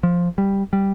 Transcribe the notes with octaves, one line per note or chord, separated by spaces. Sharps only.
F3
G3
G3